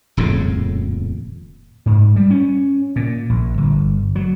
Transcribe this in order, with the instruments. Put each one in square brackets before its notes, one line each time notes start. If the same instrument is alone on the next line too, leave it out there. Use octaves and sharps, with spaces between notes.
[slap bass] D#1 F2 A2 C#3
G#2
G3
C#4
A#2
A#1
G1
F#3